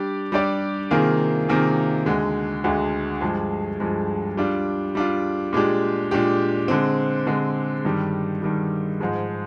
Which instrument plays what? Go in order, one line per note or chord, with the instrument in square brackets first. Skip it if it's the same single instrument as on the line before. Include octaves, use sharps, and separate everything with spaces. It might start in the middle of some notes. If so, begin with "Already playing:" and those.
Already playing: [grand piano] G3 D4 G4 D5
G3 D4 G4 D5
C3 D#3 A#3 F4 G#4
C3 D#3 A#3 F4 G#4
D2 D3 G#3
D2 D3 G#3
G2 F3 G#3
G2 F3 G#3
G3 D4 F4
G3 D4 F4
A#2 G#3 D4 G4
A#2 G#3 D4 G4
D3 G#3 C4
D3 G#3 C4
G2 D#3 G3
G2 D#3 G3
G#2 F3 G#3